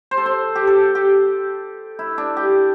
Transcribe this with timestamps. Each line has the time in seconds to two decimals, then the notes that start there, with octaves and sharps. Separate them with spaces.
0.11 C5
0.18 A4
0.26 C5
0.55 G4
0.67 A4
0.95 G4
1.99 E4
2.18 D4
2.37 G4